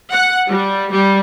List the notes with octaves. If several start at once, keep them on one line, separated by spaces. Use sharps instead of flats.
F#5
G3
G3